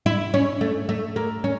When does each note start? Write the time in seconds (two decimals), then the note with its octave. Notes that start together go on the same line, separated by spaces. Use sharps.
0.06 E4
0.34 C#4
0.61 A3
0.89 A3
1.16 A#3
1.44 C#4